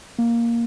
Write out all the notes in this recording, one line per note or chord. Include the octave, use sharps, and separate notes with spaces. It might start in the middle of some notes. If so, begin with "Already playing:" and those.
A#3